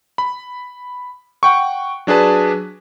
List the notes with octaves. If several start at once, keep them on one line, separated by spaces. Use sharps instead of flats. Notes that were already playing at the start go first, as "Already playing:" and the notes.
B5
F#5 G5 C#6
F#3 D4 G#4 B4 A5